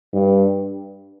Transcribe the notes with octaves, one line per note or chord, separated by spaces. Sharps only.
G2